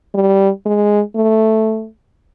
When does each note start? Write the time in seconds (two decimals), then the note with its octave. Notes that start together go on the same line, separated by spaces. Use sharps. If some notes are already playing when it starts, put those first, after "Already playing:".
0.14 G3
0.66 G#3
1.16 A3